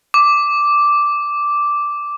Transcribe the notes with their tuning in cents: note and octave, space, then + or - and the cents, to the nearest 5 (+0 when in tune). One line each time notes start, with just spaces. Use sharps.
D6 -5